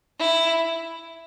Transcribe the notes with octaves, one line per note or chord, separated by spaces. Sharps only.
E4